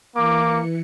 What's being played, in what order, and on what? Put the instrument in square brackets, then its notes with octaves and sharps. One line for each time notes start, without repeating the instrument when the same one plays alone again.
[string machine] E3 C#7 [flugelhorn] A#3 [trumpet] D6